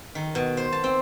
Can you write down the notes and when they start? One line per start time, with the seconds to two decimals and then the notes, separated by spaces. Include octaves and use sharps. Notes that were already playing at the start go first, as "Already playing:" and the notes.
0.15 D#3
0.35 B2
0.57 C5
0.72 A5
0.84 C4